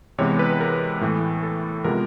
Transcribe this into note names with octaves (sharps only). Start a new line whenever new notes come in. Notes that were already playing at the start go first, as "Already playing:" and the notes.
C3 E3 G#3 B3 C#5
B4
A#4
A2 E3 A3
A4
C3 F3 G#3 B3 A#4